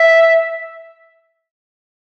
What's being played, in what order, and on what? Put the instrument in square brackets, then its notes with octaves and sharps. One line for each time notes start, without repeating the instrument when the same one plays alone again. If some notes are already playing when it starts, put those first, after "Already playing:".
Already playing: [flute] E5